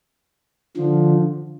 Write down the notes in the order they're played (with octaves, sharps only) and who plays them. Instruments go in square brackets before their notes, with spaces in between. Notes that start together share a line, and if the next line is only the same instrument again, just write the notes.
[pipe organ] D3 F3